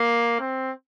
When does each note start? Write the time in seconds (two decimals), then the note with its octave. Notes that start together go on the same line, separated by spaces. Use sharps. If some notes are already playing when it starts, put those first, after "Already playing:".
Already playing: A#3
0.40 C4